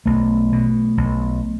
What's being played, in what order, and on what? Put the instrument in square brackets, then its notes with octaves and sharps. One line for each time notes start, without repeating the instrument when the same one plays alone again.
[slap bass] B1 A3
B2
B1